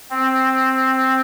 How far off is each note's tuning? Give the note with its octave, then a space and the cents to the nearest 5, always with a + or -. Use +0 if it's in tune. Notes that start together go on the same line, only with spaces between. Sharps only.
C4 +5